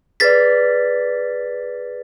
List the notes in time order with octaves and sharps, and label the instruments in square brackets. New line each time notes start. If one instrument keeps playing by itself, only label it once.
[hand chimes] G#4 B4 D5 [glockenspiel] A6 B6